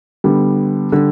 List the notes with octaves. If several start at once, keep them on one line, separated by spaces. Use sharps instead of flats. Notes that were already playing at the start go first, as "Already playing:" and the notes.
D3 G3 B3
D3 G3